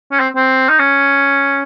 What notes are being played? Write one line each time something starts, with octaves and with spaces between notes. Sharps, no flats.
C#4
C4
C4
D#4
C#4